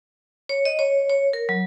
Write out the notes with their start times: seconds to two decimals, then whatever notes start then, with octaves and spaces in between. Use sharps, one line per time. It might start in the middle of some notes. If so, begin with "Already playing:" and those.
0.49 C#5
0.65 D#5
0.79 C#5
1.10 C#5
1.33 A#4
1.49 F#3